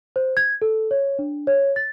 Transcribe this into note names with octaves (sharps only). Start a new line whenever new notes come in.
C5
G#6
A4
C#5
D4
C#5
A6